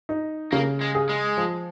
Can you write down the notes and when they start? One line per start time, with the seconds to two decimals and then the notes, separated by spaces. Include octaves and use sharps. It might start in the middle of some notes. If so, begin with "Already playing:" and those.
0.09 D#4
0.52 C#3 A#3
0.81 G#3
0.95 G#4
1.09 G#3
1.37 F3